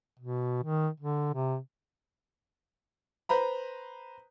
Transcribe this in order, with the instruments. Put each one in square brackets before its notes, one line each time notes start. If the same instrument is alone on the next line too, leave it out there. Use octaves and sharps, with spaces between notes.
[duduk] B2
D#3
D3
C3
[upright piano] B4 C5 A#5 B5